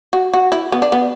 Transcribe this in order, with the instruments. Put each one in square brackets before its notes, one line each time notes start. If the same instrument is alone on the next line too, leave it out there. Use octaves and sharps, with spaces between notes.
[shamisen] F#4
F#4
E4
B3
D4
B3